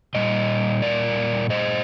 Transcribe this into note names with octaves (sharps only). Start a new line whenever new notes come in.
A#2 G3 D#5
A#4 D5
C5 D#5